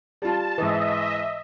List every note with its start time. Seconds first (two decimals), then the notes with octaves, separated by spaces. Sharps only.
0.22 G3 F4 A5
0.58 G#2 E3 D#5 E5